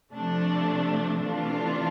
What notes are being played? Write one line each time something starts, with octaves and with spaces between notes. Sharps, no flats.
C3 F3 A3 D4
C3 E3 A3 D4 F4